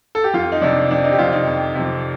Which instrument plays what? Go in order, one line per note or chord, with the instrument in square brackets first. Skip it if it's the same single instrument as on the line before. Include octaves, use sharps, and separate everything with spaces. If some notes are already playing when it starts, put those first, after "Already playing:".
[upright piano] A4
G4
F2 F4
D#4
C3 F3 D4
F2 D4
D#4
G4
C3 F3 F4
D#4
F2
C3 F3